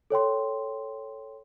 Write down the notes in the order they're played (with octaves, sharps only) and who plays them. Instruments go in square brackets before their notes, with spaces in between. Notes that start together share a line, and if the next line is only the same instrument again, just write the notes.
[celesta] A4 C#5 G5 C6